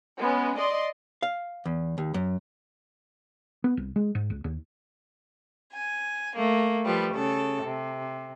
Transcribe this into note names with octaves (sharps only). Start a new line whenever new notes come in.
G#3 B3 C#4
D5 D#5 C6
F5
E2
D#2
F#2
B3
C2
G#3
G#2
C#2
D#2
G#5
A3 A#3
F3 G3 B4
C#3 A4
C3